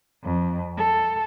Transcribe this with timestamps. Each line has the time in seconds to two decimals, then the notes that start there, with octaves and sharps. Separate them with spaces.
0.23 F2
0.78 A4